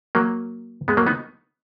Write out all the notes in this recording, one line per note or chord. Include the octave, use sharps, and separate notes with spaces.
F#3 A#3
G#3 B3
F#3 A#3
B3 D#4